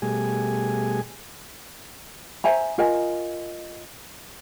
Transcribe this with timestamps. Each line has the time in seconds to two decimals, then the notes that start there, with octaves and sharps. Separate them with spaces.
0.02 B2 G3 A3 G#4 G#5
2.44 C5 E5 G#5 A#5
2.78 F4 A#4 D#5 G#5